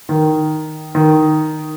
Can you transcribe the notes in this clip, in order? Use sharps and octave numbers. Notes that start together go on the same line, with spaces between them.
D#3
D#3